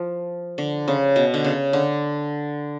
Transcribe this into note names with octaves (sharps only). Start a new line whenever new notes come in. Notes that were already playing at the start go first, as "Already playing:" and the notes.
Already playing: F3
D3
C#3
B2
D3
C#3
D3